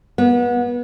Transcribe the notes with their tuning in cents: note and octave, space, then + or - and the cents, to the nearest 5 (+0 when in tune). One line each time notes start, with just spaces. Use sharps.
B3 -30